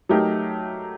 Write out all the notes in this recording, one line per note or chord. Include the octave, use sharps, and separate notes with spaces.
F#3 A3 D#4 G4 A#4